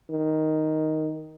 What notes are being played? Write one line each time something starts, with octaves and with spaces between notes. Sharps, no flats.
D#3